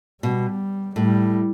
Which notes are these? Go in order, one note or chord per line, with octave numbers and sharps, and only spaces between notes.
B2 G3
A2 G3